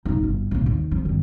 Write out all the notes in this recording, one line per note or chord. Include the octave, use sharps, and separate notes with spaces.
D#1 D#4
G1
B1 A2
D#2
F3
G2 D#3